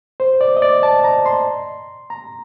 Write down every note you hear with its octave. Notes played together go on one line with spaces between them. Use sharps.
C5
D5
D#5
D5
A5
A#5
C6
A#5